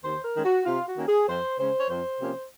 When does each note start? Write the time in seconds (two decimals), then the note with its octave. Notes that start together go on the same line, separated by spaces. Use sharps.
0.03 D#2 C5
0.24 A#4
0.35 D#3 G#3 C#4
0.45 F#4
0.65 C3 F4
0.86 F#4
0.97 D#3 A#3 C#4
1.07 G#4
1.28 F2 C5
1.59 C#3 G#3 C#4 C5
1.79 C#5
1.90 F2 C5
2.21 C3 F3 A#3 C#4